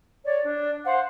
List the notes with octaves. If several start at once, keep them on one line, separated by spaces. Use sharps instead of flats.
C#5 D5
D4
C5 F5 F#5